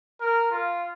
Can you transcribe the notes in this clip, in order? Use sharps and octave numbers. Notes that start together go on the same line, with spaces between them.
A#4
F4